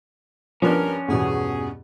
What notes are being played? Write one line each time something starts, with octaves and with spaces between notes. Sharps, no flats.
G2 F3 B3 C#4 D4 A#4
E2 G2 B2 G#4